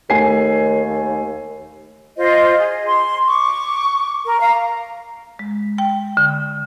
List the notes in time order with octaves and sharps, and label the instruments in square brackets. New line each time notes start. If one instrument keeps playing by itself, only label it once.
[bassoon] D#2 [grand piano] A3 G#5 C7
[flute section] F4 C5 D#5
G#4
C6
C#6 D6
A#4
F5 A#5
[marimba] G#3
G5
D3